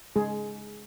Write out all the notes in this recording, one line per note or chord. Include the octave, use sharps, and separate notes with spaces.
G#3 G#4